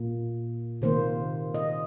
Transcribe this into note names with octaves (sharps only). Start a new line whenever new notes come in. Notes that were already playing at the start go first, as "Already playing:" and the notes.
Already playing: A#2 A#3
C3 D#3 A#3 C5
D#5